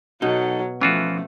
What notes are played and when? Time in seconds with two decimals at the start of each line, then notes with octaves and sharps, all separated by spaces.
0.22 B2 F#3 D#4 A4
0.81 E3 F3 A3 C#4 F4 F#4